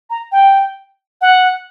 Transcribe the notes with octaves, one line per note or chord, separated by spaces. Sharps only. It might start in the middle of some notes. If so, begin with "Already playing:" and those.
A#5
G5
F#5